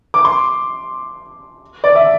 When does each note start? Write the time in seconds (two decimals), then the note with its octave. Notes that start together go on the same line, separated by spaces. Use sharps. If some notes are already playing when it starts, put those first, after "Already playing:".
0.14 D6
0.25 C6
1.84 D5
1.95 E5